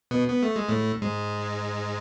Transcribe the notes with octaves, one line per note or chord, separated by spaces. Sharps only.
B2 B3
B3
A3
G#3
A2 A3
G#2 G#3